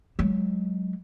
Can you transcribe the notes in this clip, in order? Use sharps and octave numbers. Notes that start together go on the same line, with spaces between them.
F#3 G#3